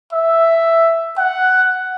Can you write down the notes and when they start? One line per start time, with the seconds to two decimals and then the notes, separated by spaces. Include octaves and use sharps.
0.13 E5
1.17 F#5